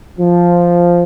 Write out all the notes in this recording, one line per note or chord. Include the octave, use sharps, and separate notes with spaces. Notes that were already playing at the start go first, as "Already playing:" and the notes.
F3